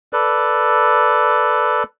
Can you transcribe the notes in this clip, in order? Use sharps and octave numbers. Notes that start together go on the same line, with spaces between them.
A4 B4 D5